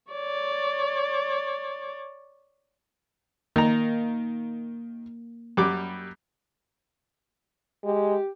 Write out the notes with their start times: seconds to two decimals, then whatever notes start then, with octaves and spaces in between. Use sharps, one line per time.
0.12 C#5 D5
3.56 D#3 A#3 A#5
5.57 F#2 G3 D6
7.84 G#3 G4